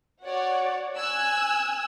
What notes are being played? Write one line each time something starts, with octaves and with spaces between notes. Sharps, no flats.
F#4 C#5 D5 F#5
G#5 E6 F#6 G#6